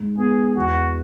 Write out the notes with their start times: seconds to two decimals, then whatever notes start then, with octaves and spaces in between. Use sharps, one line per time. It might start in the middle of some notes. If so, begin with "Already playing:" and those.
Already playing: G#2
0.17 B3 G#4
0.56 E2 F#4